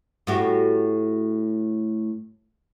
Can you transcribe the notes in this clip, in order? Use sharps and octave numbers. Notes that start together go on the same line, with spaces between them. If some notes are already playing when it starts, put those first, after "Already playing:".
A2 F#4 G4